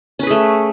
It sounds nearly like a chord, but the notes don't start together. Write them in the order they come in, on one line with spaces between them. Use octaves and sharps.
C#4 B4 G#4 A3